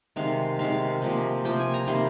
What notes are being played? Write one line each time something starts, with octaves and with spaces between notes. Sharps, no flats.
C3 D#3 G#3 F5
C3 D#3 G#3 F5
C3 F3 A#3
C3 F3 A#3 G5
G#5
A#5
C3 D#3 G3 A#3 C6